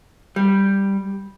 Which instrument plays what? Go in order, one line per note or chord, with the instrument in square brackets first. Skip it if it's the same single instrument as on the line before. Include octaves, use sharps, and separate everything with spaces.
[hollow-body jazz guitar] G3